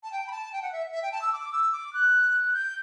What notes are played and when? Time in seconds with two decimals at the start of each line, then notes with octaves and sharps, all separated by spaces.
0.04 A5
0.12 G5
0.27 B5
0.31 A5
0.53 G5
0.62 F#5
0.72 E5
0.92 E5
1.03 G5
1.12 A5
1.22 E6
1.32 D6
1.52 E6
1.72 D6
1.93 F#6
2.54 G6